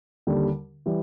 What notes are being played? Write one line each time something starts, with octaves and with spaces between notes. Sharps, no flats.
D#2 D3 G3
E3 G3